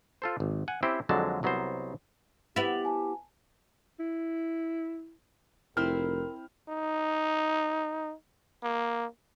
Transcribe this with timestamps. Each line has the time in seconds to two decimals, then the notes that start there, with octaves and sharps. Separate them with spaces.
0.22 F4 A4 C5
0.40 G#1
0.68 F#5 G#5
0.83 C4 C#4 E4 G4 C5
1.09 F2 D3 F#3 G#3 A5
1.43 C2 F#3 B3 A#4 C5
2.56 B3 E4 G4 A6 F7 F#7
2.85 G#5 A5
3.99 E4
5.77 F1 C4 E4 A#4 C6 F6
6.69 D#4
8.63 A#3